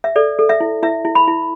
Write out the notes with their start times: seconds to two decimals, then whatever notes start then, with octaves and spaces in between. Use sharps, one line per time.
0.04 E5
0.16 A4 D5
0.39 A4
0.49 E5
0.60 E4
0.83 E4 E5
1.05 E4
1.15 B5
1.27 E4